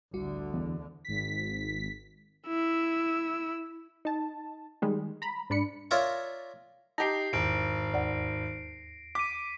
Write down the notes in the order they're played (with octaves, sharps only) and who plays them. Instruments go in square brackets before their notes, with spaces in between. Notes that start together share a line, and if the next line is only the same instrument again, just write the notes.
[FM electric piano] A1 G3 F#4 [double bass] D2 D3
[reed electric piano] E2
[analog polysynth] G#1 B6
[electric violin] E4 E6
[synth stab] D#4 A5
D#3 G3 G#3
A#5 B5
G#2 D4 B5 C#7
[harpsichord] F4 A#4 C#5 D5 E5 A#5
[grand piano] D#4 G4 [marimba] A5 [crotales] A#6 C7
[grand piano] G#1 [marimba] E2 [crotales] D7
[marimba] D#2 D5 F#5
[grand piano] D6 [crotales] B6 D#7